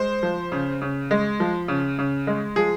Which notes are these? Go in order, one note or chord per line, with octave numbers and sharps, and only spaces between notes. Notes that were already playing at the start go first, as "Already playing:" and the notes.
Already playing: G#3 C5
F3
C#3
C#3
G#3
F3
C#3
C#3
G#3
F3 G#4